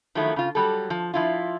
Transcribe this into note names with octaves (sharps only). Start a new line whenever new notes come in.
D#3 F3 F#3 A3 E4
C#3 F4
F#3 G3 A4
F3
F3 E4 F4